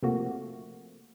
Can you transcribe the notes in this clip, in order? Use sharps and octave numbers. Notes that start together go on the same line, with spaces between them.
C3 F3 A3 A#3 F#4